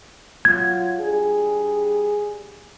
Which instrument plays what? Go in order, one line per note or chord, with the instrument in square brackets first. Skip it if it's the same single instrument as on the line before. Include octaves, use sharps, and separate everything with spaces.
[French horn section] F#3 F4 [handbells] G#6
[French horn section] G3 D4 G#4